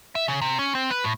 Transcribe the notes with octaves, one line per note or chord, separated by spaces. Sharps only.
E5
C#3
C3
C#4
C4
B4
A2